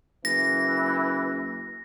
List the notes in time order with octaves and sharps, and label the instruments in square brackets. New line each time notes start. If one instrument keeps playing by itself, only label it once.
[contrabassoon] F#1 [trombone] E3 [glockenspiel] A#6